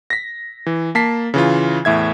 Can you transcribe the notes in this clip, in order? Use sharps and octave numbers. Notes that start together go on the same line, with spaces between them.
A#6 B6
E3
A#3 A5 B6 C7
C#3 E3 F4
E2 A2 E5 G#6